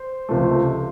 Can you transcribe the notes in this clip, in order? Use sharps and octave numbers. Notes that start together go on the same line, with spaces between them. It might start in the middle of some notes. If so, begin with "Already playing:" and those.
Already playing: C5
C#2 C3 F3 A3